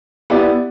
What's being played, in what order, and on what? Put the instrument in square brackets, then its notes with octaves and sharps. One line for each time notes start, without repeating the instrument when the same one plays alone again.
[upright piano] B3 E4 G4 D5